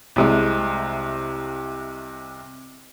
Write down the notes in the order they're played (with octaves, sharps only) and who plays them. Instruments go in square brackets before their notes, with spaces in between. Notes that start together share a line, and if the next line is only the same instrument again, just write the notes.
[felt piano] C2 C3 G#3